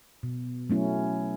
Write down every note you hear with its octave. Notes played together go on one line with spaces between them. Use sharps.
B2
F#3 A3 C#4 E4